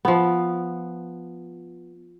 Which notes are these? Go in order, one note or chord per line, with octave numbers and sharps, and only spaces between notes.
F3 B3